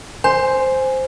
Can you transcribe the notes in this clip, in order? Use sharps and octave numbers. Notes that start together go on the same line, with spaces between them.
C5 G#5